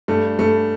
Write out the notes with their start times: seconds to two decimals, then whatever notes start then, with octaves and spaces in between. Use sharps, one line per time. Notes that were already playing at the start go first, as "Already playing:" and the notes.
0.08 G2 A3
0.39 G2 A3